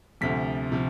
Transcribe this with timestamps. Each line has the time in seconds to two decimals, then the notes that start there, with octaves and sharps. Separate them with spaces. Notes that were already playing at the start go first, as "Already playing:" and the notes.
0.21 D2 C3 F3 B6
0.72 C3 F3